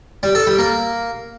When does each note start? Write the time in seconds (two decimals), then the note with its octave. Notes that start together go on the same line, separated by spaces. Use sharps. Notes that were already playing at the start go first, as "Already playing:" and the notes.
0.23 G3
0.35 A4
0.47 G3
0.59 A#3